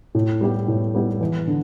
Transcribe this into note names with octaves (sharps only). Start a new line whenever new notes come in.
A2
G3 B3 E4 G4
A2
G3 B3 E4 G4
E2
D3